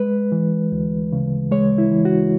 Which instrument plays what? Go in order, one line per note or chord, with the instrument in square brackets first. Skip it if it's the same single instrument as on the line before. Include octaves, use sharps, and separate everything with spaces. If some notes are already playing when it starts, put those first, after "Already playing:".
Already playing: [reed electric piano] G#3 B4
E3
D2
C#3
G#3 C#5
E4
E3
F#4